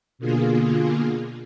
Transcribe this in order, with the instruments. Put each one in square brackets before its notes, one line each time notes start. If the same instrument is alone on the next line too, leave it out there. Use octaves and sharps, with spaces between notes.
[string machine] B2 D3 A#3 F4 G#4